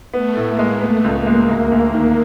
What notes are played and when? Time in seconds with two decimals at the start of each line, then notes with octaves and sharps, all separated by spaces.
0.14 A3 B3
0.37 A2
0.47 A#3
0.59 G#3
0.81 A3 B3
1.04 C#2
1.15 A#3
1.27 G#3
1.49 D2
1.71 D2
1.93 D#3